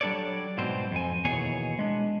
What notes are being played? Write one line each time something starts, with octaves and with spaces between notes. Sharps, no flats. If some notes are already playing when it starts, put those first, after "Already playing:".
F#3 G3 D4 A4 C#5 D5
G#2 B2 C4 C5
F2 G#5
D#2 B2 E3 G#4 C#5 G#5
G#3 D4